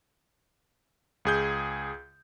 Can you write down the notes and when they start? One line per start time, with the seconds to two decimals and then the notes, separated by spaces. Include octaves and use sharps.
1.25 C#2 G#4 G6